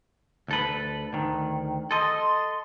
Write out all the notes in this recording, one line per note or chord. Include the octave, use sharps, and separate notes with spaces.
D2 A4 B4
D2 D#3
A4 D#5 C6